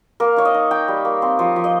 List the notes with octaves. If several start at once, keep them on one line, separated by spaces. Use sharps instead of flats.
A#3 A#4
D#4 C#5
D#5
D#4
D#4 G5
G3
A#3
C4
F3
F3
D#5